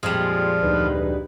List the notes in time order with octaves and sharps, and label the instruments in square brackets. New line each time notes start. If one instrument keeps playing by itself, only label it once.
[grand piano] F2 A#2 [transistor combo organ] F3 [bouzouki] G3 G#3
[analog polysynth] F4 G#4
D2 D#4 B4